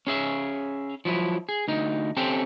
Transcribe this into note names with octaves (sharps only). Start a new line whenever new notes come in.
C#4 G#4 E5
F3 F#3 E4
G#4
D2 D#4
C4 C#4 G4 A4 G5